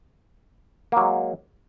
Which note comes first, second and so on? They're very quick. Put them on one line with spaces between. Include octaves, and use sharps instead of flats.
A#3 F#3 G#3